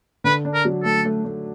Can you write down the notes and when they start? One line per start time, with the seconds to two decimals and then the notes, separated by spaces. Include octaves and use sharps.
0.24 D3 B4
0.45 D4
0.54 A#4
0.65 F#3
0.84 A3 A4
1.05 A3
1.25 A3